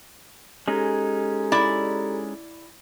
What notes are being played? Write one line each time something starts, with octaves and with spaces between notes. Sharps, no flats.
G#3 C#4 D#4 G4 A4 A#5
E4 D5